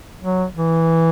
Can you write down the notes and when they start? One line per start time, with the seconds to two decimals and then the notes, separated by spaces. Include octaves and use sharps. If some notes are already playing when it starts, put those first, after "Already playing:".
0.20 F#3
0.56 E3